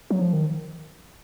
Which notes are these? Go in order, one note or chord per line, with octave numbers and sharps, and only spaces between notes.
F#3
F3
D#3